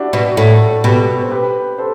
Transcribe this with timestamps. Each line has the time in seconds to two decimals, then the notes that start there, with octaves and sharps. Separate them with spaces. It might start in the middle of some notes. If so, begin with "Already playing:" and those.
Already playing: D4 E4 F#4 G4
0.13 B2
0.36 A2 F#4 A4
0.84 B2 G4 B4
1.22 C5
1.31 G4 B4
1.78 A4 C5